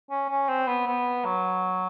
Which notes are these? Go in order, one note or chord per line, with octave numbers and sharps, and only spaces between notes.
C#4
C#4
C4
B3
B3
F#3